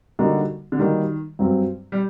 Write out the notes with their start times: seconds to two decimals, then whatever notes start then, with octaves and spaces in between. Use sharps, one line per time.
0.19 D3 G3 A#3 D#4 F#4
0.72 D3
0.79 D#3 G3 A#3 D#4 F#4
1.39 G2 F#3 C4
1.92 G3